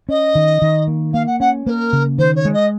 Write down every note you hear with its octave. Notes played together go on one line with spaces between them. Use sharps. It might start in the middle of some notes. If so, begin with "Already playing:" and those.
C#4 D#5
D#3
D#3
A#3
A#3 F5
F#5
C#4 F#5
A#3 A#4 C5
C#3
D#3 C5
C#5
G#3
D#5